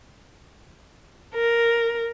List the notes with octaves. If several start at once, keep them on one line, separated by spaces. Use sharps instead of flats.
A#4